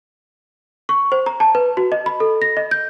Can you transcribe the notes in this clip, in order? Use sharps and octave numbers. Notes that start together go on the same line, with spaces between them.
C#6
C5
A#5
A5
B4
F#4
D#5
B5
A4
A#6
D#5
G6